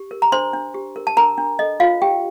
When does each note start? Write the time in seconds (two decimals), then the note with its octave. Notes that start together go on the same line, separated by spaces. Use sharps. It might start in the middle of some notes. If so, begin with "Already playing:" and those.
Already playing: G4
0.11 A#4
0.22 A#5
0.32 D4 C5 C6
0.53 D4
0.74 G4
0.96 A#4
1.07 A5
1.17 D4 A#4 A#5
1.38 D4
1.59 A4 D#5
1.80 F4 C5 F5
2.02 D#4 G4 G5